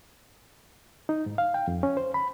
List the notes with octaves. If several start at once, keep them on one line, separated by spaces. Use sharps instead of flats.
D#4
G#2
F5
G5
F2
C#4
C5
B5